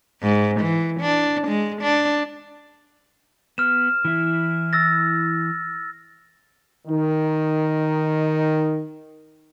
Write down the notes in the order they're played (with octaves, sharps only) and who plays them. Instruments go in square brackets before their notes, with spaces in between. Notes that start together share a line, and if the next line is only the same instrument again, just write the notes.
[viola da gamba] G#2
E3
D4
G#3
D4
[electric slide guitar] B3 [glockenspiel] F6 E7
[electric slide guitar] E3 E4
[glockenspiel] E6 A6 A#6
[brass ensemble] D#3 D#4